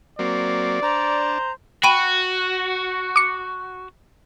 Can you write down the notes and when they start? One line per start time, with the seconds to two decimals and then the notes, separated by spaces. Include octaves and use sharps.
0.19 F#3 A#3 C4 D5
0.82 D4 C5 A#5
1.84 F#4 G5 B5 D#7
3.16 D6 C#7